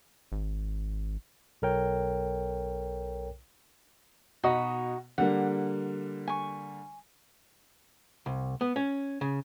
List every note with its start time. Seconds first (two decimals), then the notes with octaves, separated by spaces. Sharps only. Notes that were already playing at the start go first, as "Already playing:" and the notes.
0.32 G#1
1.62 B1 A4 A#4 C#5 G5
4.43 B2 D#4 F#4 D#5 B5
5.18 D3 G3 A#3 F#5
6.28 G#5 C#6
8.26 C2
8.61 B3
8.76 C#4
9.21 C#3